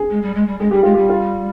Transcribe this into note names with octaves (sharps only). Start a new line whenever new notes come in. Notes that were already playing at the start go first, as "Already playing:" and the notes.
Already playing: G#4
G#3
G3
G#3
G3
G#3 G#4
G3 G4
G#3 F4
G3 G4
F4